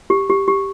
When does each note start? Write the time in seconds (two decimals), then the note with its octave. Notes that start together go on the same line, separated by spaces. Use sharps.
0.10 G4
0.30 G4
0.48 G4